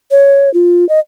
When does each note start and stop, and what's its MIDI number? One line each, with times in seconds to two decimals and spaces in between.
0.11 0.52 73
0.54 0.87 65
0.89 0.99 75